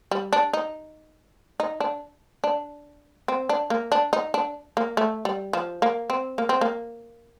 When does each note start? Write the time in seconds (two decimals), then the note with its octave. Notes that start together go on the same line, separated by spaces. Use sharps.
0.11 G3
0.33 D4
0.53 D#4
1.60 D#4
1.80 D4
2.44 D4
3.28 C4
3.49 D4
3.70 A#3
3.92 D4
4.13 D#4
4.34 D4
4.77 A#3
4.97 A3
5.25 G3
5.53 F3
5.82 A#3
6.10 C4
6.38 A#3
6.49 C4
6.61 A#3